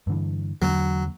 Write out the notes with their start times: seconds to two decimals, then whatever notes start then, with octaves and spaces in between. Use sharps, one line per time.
0.07 G2 D3 E3
0.62 E2 D3 F#3